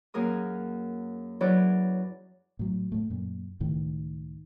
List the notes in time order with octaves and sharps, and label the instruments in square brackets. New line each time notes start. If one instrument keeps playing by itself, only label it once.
[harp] F#2 A#3 G#4 A#4 D#6
F#3 E4 G#4 B4 C#5 D5
[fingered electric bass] A2 F#3
A2 A3
F#2 A#2
C#2 A2 D#3